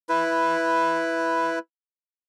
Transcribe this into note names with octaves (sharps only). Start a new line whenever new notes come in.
E4 B4